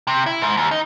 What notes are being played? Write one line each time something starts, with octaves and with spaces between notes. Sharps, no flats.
C3
E4
G#2
D#2
D#4